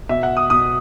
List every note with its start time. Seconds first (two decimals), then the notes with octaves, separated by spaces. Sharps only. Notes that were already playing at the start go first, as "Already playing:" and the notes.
0.09 B2 E5
0.23 F#5
0.37 D#6
0.50 B2 D#6